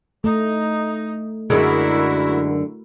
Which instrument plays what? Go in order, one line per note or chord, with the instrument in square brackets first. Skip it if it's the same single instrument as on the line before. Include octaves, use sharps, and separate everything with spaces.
[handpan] A3 [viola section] D#4
[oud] F#2 D3 G#3 [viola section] E4 F#4 A#4